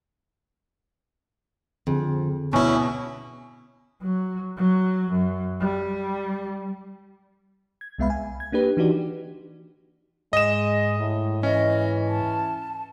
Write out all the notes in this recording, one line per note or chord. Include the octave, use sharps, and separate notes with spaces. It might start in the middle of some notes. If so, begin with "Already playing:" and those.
F2 D3 C4 G#4
D2 B2 C#4 E4
F#3
F#3
F#2
G3
G#6
C2 G#3 B3 E5 F5 B5
G#5
G#6
A#3 D4 G4 B4
E3 D4 D#4 F#4 G4 D5
G#2 G#3 D#5 E7
A2
E3 C#4 D#5
A5